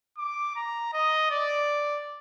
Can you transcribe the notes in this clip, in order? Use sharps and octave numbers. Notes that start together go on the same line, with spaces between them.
D6
A#5
D#5
D5